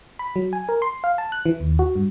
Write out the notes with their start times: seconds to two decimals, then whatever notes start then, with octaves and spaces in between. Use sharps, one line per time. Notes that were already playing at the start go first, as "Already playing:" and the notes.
0.19 B5
0.36 F#3
0.53 G#5
0.69 A#4
0.82 C6
1.04 F5
1.18 A5
1.32 F#6
1.46 E3
1.60 D#2
1.79 F#4
1.95 G2